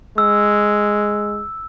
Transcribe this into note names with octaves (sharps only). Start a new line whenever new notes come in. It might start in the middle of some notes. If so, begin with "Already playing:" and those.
G#3 E6